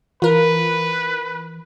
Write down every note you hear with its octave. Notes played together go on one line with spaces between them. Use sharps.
E3 F4 A#4 B4